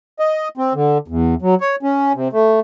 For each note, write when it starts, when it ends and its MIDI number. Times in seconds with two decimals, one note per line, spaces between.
0.20 0.49 75
0.57 0.73 60
0.74 0.98 50
1.08 1.35 40
1.42 1.55 54
1.61 1.76 73
1.83 2.12 61
2.14 2.28 48
2.33 2.60 57